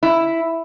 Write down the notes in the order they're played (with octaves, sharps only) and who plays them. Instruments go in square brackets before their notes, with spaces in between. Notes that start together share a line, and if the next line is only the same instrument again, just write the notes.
[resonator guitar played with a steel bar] E4